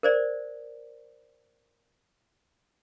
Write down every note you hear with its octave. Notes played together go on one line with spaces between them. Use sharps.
A#4 C5 D5